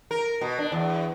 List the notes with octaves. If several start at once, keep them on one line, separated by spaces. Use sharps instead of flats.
A#4
B2
D4
E2